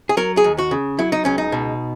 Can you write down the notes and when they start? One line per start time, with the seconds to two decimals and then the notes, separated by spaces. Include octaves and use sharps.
0.09 G#4
0.17 F#3 A#4
0.37 G#4
0.44 D#2
0.58 F#4
0.71 C#3
0.99 F#3 E4
1.12 D#4
1.25 C#2 C#4
1.38 D#4
1.52 B2